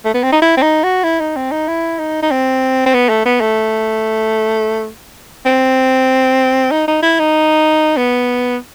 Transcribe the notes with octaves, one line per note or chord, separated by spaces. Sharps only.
A3
B3
C4
D#4
E4
C4
D#4
F#4
E4
D#4
C4
D#4
E4
D#4
D#4
C4
C4
B3
A3
B3
A3
C4
D#4
D#4
E4
D#4
B3